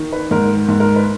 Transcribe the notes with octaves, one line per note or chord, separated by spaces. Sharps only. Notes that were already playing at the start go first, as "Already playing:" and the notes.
Already playing: D#3
B4
G#2 A#4
G#2
A#4
B4